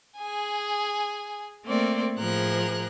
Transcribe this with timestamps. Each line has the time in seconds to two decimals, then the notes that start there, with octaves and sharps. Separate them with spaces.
0.18 G#4 G#5
1.64 A3 A#3 C4 D5
2.16 A2 F3 G#4 A#4 F#6